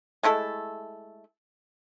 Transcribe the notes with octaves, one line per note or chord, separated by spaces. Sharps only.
G#3 A3 E4 A4